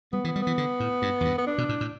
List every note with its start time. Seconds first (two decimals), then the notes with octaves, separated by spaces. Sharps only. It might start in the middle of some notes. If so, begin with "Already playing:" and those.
0.13 G3 B3
0.24 E3
0.28 B3
0.36 G3
0.42 E3 B3
0.58 D3
0.80 A2
1.02 G2
1.21 E2
1.25 G2
1.38 B3
1.47 D4
1.58 B2
1.69 A2
1.81 A2